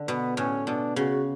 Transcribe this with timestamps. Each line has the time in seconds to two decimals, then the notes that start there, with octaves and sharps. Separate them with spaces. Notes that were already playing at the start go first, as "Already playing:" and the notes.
Already playing: D3
0.08 B2 B3
0.37 A2 C#4
0.67 B2 D4
0.96 C#3 F#4